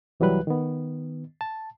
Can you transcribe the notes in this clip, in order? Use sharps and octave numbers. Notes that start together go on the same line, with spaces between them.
C2 E3 F#3 G3 B4 F#6
D#3 B3
A5